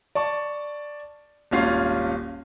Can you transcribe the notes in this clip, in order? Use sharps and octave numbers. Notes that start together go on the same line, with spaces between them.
D5 A5 C#6
D#1 G#1 C#4 F4 F6 C7